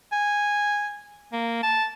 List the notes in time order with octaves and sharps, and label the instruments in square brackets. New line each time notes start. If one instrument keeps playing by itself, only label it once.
[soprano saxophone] G#5
A#3
A5